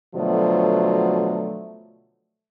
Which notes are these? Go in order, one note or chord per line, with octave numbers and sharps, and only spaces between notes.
B2 D3 F3 F#3 A3